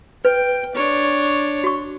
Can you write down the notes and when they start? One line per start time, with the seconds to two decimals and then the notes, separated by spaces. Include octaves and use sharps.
0.25 B4 G5
0.75 D4 C#5
1.64 F#4 C#6